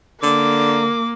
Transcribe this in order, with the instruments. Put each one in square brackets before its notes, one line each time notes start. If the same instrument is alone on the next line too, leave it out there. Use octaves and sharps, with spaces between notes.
[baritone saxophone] D3 [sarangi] A#3 [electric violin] D6